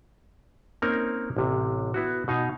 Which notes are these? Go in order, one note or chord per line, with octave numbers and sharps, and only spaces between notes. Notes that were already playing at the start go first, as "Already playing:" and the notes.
A#3 C4 C#4 D#4 A#4
A1 C3
B3 E4 F#4
B2 D#4 F5 G#5